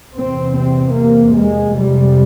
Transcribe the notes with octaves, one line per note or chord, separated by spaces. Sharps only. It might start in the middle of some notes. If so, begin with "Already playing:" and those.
E2 C3 C4
C4
A#3
G#3
F2 C3 G3